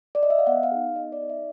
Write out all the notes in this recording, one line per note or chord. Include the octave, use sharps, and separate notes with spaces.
D5
D#5
E5
F5
B3 F#5
F5
D#4 G#4
B3 D#5
D5
D#4 G#4
E5